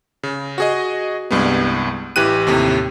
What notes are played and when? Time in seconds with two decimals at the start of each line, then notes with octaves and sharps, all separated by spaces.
0.23 C#3
0.58 F#4 G#4 D#5
1.31 C2 G2 G#3 B3
2.16 A1 E3 G4 F#6 D#7
2.47 D#2 A2 C3